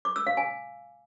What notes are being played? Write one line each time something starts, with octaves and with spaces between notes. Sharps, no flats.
D6
E6
F5
G#5